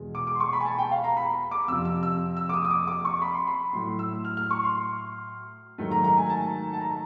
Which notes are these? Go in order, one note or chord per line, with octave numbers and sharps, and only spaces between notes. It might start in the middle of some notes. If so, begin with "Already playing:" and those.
Already playing: E2 B2 G#3
D6
D6
C6
C#6
B5
G#5
A5
G5
F5
A#5
B5
D6
F2 C3 F3 E6
E6
E6
E6
D6
D#6
D#6
D6
D6
C#6
B5
C6
B5
A2 F#3 A3 C6
E6
F6
F6
C#6
C6
G#2 D#3 F#3 A3
A#5
A#5
G#5
A5
A5
A#5